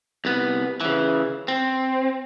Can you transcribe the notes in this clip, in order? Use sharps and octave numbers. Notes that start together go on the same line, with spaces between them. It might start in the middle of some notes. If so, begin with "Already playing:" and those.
C2 B3
C#3 E3
C4